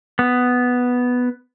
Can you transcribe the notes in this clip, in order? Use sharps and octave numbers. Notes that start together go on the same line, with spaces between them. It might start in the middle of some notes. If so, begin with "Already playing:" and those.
B3